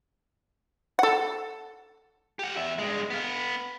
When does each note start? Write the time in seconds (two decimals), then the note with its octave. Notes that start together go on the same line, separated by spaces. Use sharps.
0.99 A4 F#5
2.39 G4 F#5
2.56 E2 E5
2.79 G2 G#3
3.10 B3 F5